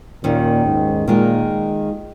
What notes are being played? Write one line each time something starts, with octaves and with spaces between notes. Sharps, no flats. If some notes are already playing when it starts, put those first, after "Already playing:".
D#2 A#2 D#3 C#4
G#2
A#2 D#3 G#3 F4